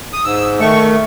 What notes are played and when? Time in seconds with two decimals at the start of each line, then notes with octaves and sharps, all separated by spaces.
0.13 D#6
0.24 G#2 E6
0.60 D#3 A3 C#6